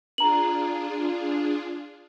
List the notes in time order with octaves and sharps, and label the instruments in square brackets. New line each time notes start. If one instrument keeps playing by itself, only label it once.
[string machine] D4 F4 G#4 [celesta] A#5 F#7